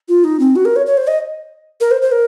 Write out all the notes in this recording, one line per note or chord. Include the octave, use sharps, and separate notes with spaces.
F4
D#4
C4
F#4
A#4
C#5
C#5
C5
D#5
A#4
C5
C5
A#4